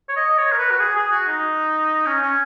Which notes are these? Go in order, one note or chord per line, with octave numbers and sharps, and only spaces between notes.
C#5
D#5
C#5
A#4
B4
F#4
G#4
G#4
F#4
D#4
C#4
C#4